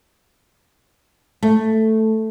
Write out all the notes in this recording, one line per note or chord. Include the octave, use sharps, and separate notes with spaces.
A3